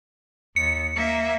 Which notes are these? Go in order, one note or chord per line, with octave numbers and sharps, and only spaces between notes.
D#2 C#7
A#3 E5